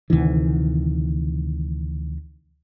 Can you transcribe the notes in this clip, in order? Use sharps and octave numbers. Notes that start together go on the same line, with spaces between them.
D2 C3 D#3 E3